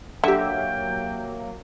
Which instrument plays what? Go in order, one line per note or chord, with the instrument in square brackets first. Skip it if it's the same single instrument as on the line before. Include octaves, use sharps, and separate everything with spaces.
[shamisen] D3 [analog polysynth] F#3 A#3 [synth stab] G4 E5 [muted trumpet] G5